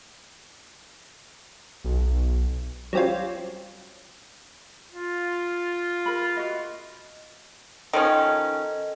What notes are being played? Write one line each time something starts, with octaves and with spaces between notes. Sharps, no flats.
B1
F#3 G3 C4 C#4 F4
F4
A#4 B5
F#4 D#5
D#3 F3 C#4 A4 D#5